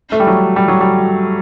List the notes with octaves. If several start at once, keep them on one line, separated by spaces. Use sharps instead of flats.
A3
G3
F#3
G3
F#3
G3